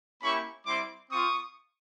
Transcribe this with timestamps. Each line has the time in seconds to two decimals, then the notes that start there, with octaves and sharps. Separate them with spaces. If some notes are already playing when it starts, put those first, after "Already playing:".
0.22 A#3 C#4 E4 G4 B5 C#6
0.66 G3 C4 E4 C6 D6
1.10 C4 F4 C#6 D#6